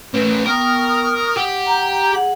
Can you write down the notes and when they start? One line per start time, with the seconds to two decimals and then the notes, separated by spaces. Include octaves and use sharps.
0.14 A2 C#4 E4 A#4 B4
0.46 B3 A#4 G5 C#6 D#6 F6
1.37 G4 F#5
1.67 A#5 G6
2.11 G#4 F#5